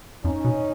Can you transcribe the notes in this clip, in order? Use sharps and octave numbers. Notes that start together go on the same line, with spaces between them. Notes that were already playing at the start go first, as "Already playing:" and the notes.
F2 C#4 D#4
B2